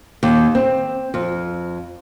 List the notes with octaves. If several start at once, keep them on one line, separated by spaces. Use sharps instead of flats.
D#2
C4
F2